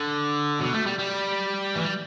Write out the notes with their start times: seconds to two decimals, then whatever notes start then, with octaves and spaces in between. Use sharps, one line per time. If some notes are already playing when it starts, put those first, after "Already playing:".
Already playing: D3
0.60 B2
0.73 A3
0.86 G3
0.98 G3
1.75 E3
1.84 G3